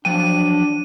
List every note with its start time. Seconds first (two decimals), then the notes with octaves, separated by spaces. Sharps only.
0.05 F3 F#3 D4 G5 D#7